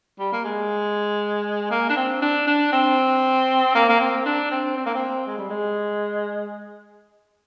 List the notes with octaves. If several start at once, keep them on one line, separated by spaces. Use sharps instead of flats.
G3
A#3
G#3
A#3
D4
C4
D4
D4
C4
A#3
A#3
C4
D4
C4
C4
A#3
C4
G#3
G3
G#3